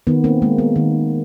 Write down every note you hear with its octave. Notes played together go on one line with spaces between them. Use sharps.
D#3 B3
A#3 C4
G#3 A#3
B3
D#3